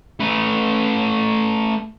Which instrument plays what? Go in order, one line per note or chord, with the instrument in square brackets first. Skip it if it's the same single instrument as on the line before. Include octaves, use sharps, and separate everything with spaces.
[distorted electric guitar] A3 B4